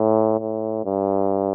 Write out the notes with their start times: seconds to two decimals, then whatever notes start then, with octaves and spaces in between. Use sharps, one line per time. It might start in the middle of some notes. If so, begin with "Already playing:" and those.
Already playing: A2
0.39 A2
0.85 G2